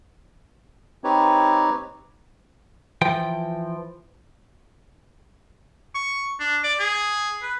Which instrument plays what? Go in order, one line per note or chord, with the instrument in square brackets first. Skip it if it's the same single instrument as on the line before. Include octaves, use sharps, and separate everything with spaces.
[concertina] C4 D#4 G4 B4 C#5
[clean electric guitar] E3 F3 G5
[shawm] C#6
D4
D5
G#4
B4